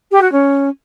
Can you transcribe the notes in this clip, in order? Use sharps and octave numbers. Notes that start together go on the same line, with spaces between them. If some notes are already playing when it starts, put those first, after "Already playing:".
G4
F#4
C#4